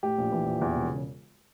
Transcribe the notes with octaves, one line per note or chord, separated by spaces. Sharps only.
A2 G4
A#1
E3
A#1
E2
E1
C#3